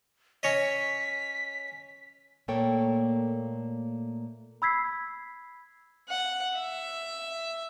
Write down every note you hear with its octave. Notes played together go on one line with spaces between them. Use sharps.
C#4 C#5 D#5 B6
A#2 A3 A#3 A4 C#5 G5
B5 E6 G#6 B6 C7
F#5
E5